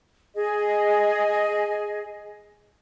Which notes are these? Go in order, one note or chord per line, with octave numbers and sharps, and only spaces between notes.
G#4 D#5